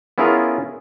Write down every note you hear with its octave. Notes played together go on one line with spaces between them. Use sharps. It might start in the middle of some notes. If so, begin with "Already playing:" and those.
B3 C#4 E4 F4 G#4 A#4